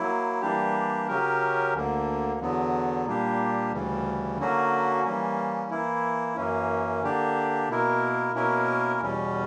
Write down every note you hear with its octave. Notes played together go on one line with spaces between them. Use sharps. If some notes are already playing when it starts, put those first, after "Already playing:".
Already playing: F#3 A#3 E4
E3 G3 A#3 D4 G4
C#3 F#3 C#4 G4 A#4
D2 D3 A#3
E2 D3 F#3 B3
A#2 G3 A#3 D4 G4
D2 C#3 E3 G3
D3 F#3 A#3 C#4 F#4
E3 G3 A#3 C#4
E3 A#3 E4
F#2 E3 A#3 C#4
D3 A#3 D4 G4
B2 A#3 E4 A#4
B2 A#3 C#4 E4 A#4
E2 B2 G3 C#4